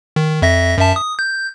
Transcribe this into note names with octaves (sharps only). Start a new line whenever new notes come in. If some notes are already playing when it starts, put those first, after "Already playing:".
D#3
F2 E5 A#6
F#2 E5 A5
D#6
G6